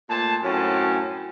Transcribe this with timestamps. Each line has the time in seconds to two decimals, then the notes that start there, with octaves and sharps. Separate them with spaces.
0.10 A#2 A3 C5 A5
0.42 F#2 A2 F#3 C4 C#4 A5